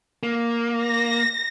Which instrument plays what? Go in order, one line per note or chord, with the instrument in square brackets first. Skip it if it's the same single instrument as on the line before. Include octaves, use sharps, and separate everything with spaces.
[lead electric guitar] A#3
[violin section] A#6